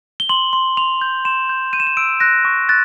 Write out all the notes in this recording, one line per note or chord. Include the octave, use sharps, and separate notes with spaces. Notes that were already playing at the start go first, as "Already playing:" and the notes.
G7
C6 F#7
C6
C6 F7
G6
C6 E7
G6
G6 D#7
E7
D#7
E6 D7
F#6 A#6
C#6
F#6 A6